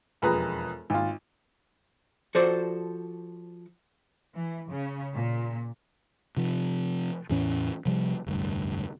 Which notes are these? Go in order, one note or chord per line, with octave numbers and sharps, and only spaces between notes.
E1 F2 G#4 B4 A#5 D#6
G#1 F4
F3 F#4 A4 C5 D5
E3
C#3
A#2
C3 F3
E2 A2 E3 C#4
C3 F3 G3
F1 D2 G2